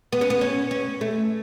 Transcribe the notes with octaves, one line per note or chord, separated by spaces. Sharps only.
B3
C#4
B3
C#4
C#4
A3